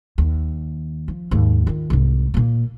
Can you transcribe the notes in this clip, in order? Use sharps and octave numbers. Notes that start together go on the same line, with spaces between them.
D#2
F3
D#2 G#2
D#3 F4
C2 G#2
A#2 A#3